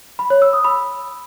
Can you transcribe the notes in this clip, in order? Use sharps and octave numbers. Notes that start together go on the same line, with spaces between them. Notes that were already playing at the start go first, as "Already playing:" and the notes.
B5
C#5
E6
D#6
B5